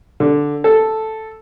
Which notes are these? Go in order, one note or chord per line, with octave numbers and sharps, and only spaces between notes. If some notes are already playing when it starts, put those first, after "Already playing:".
D3
A4